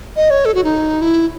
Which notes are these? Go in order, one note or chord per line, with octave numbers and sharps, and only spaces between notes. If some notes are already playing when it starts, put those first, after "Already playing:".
D#5
C#5
A4
F#4
D#4
E4